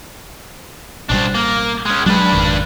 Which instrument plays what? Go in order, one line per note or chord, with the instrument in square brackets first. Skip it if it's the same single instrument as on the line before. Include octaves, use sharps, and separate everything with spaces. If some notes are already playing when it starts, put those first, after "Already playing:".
[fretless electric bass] A1 B2 G3 [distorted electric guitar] D4 C5
[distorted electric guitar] A#3
G#3 C#4
[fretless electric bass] F#3 G#3 [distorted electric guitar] D4 B4
[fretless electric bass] G#1 F2 D#3